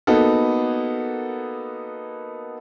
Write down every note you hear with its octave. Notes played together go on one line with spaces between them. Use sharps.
A#3 B3 D#4 F#4 A4